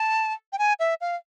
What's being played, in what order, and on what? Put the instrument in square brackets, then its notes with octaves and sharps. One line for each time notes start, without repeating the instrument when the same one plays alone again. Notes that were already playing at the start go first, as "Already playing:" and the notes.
Already playing: [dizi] A5
G5
G#5
E5
F5